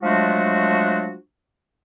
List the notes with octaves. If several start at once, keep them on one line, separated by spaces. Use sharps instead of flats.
F3 F#3 G#3 A3 D4 F#4